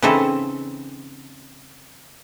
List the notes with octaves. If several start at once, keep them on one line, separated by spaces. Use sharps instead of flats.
C#3 E3 C4 D#4 E4 A4